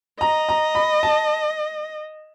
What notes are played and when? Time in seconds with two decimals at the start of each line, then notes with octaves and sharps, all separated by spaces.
0.21 D#5 A#5
0.49 A#5
0.75 B5
1.03 A5